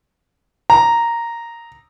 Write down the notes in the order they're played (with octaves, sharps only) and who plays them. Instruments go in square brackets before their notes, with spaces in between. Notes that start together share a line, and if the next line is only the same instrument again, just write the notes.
[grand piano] A#5